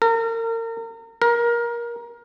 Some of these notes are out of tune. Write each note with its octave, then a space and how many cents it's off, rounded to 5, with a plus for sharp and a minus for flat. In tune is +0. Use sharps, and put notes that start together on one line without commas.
A#4 -35
A#4 +20